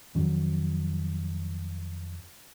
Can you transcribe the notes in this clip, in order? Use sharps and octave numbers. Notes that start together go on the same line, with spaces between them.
F2 D#3 F#3 C#4